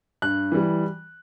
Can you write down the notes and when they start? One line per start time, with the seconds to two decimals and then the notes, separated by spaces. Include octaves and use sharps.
0.22 G2 F#6
0.52 E3 G3